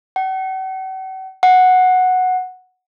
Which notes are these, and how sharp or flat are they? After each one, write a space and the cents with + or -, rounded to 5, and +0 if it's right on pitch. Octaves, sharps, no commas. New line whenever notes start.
F#5 +45
F#5 -5